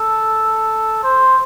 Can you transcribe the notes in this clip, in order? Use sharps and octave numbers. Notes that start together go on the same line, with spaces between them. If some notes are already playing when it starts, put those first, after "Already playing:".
Already playing: A4
C5